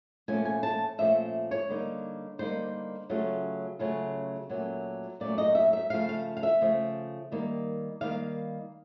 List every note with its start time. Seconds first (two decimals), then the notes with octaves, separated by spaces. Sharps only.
0.28 A#2 F3 A3 C#4 G#5
0.45 G#5
0.63 A5
0.98 A#2 F3 A3 C#4 E5
1.51 C#5
1.69 D3 G3 A#3 D#4
2.39 D3 G3 A#3 D#4 C5
3.10 C#3 F#3 A3 C#4 F4
3.79 C#3 F#3 A3 C#4 F4
4.49 A#2 F#3 A3 C#4
5.20 A#2 F#3 A3 C#4 D5
5.38 D#5
5.55 E5
5.73 E5
5.90 C#3 F3 A3 F5
6.09 F5
6.37 F5
6.43 E5
6.61 C#3 F3 A3
7.32 D#3 G3 A#3
8.01 D#3 G3 A#3 F5